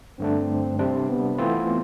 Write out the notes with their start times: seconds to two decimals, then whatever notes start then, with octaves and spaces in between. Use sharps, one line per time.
0.19 G2 D3 A3 C4 D4
0.79 C3 G3 C4 D4
1.08 B3
1.38 E3 A3 C4 F4